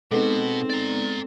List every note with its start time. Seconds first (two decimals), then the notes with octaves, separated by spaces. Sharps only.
0.11 B2 G#3 B3 C4 D#4 F#4 A4
0.70 D5 A#5